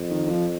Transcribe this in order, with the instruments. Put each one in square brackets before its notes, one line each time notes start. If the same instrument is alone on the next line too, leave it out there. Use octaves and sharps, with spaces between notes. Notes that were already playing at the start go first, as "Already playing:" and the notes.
Already playing: [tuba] F2
[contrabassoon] D#3
D#3
F3